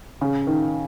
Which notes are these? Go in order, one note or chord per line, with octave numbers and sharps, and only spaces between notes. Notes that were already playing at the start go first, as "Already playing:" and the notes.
C#3
D#3